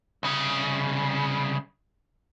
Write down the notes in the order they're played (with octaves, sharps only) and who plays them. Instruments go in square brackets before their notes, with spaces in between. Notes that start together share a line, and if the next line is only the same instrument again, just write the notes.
[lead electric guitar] C2 C#3